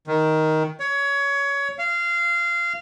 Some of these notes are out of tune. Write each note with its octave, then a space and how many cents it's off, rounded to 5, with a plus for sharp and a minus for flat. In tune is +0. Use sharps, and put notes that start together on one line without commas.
D#3 +10
C#5 +20
F5 -20